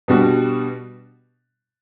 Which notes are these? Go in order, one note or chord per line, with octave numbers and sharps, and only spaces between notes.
B2 G3 B3 D4 F#4